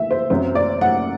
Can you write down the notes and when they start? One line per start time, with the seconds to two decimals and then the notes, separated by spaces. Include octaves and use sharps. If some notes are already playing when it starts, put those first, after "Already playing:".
Already playing: E5
0.11 C5
0.30 F#2 F#3 C4 C5
0.55 D5
0.81 F#5